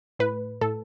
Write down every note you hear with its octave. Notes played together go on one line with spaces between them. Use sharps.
A2 B4
A2 A4